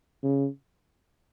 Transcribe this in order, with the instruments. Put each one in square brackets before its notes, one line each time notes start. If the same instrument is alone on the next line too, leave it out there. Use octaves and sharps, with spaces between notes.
[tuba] C#3